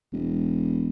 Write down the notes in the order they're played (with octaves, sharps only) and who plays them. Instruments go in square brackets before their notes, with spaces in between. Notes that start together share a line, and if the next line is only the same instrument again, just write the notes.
[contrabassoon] E1